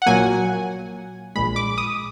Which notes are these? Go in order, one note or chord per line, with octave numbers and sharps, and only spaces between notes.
F#5
A#1 A#2 F#3 A#3 G#5
A#1 A#2 G#3 B5
D6
D#6